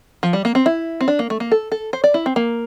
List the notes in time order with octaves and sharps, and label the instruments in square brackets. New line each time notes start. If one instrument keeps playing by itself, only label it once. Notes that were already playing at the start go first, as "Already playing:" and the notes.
[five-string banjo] F3
G3
A#3
C4
E4
C4
D4
A#3
A3
A#3
A4
A4
C5
D5
E4
C4
A#3